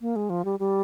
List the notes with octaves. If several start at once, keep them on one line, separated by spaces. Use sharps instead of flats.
A#3
G#3
F3
G3
G3